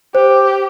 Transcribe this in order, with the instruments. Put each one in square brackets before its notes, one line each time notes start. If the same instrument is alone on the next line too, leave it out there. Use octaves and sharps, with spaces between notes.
[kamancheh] G4 [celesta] C5